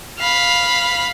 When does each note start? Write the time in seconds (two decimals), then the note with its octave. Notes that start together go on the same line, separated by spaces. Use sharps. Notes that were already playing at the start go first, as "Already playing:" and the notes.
0.20 F5 B5